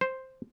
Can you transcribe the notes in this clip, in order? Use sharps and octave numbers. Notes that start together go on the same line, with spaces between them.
C5